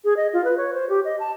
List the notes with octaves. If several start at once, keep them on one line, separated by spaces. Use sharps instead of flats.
G#4
D#5
F4
B4
C#5
C5
G4
D#5
A5